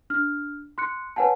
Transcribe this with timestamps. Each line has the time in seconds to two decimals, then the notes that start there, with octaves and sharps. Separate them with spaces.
0.10 D4 F6
0.78 C6 F#6 C#7
1.16 B4 C#5 F#5 G#5 A5